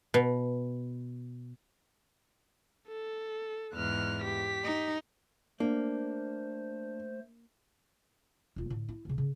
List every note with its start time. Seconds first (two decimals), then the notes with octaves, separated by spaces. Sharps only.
0.14 B2
2.87 A4
3.74 E2 G#2 F6 F#6
4.22 G4 B6
4.64 D#4
5.60 A3 A#3 D4 C5
8.56 E1 F4
8.70 A2 D3
8.89 E4
9.05 D2 C#3
9.18 C#3